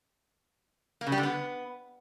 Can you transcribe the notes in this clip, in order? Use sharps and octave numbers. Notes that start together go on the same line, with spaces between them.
A#3
C#3
G3
D3
B3